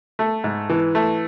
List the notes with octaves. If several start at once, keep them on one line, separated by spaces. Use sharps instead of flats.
A3
G#2
E3
A3